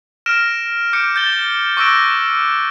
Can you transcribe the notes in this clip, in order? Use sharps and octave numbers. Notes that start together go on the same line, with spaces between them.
F6 A#6 D7 E7
D6 G6 C#7 D7
G6 A6 G7
C#6 D6 E6 F#6 A#6 D7